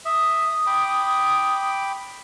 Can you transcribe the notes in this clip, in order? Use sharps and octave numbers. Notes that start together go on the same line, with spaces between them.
E5 D#6
G5 B5 D6